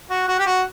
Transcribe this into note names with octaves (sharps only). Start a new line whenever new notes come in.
F#4
F#4
G4
F#4